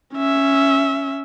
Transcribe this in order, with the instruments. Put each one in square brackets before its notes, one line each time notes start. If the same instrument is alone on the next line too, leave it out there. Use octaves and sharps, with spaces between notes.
[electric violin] C#4 E5